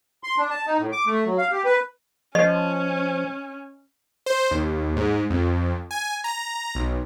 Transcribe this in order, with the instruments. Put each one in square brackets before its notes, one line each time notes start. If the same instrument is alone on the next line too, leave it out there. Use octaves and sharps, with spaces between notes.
[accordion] C6
D4
A5
D#4
A2
D6
A3
F#3
F5
G4
B4
[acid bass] F3 [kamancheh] C#4 [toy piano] D#5
[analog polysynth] C5
D#2
G#2
F2
G#5
A#5
B1